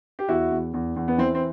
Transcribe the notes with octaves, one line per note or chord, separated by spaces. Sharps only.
G4
E2 E4 F#4
E2
E2
E2
B3
E3 C4
C4